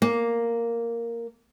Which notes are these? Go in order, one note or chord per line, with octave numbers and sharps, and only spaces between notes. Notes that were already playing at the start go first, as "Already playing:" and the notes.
A#3